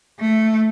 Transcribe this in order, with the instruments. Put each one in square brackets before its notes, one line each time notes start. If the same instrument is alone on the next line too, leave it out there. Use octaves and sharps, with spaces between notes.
[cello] A3